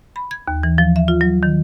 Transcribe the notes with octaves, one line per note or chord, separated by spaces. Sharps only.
B5
G#6
D#2
E3
F3
E5
F4
F#3
D#3